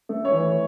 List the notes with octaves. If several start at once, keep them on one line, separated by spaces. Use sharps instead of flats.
A3
C#5
E3